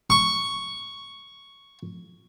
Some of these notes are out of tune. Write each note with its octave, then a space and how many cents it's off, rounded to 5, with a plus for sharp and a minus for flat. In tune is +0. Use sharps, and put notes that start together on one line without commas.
C#6 +0